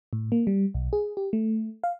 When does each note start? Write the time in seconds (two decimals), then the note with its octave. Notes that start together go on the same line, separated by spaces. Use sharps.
0.13 A2
0.32 A#3
0.47 G3
0.74 B1
0.93 G#4
1.17 G4
1.33 A3
1.84 F5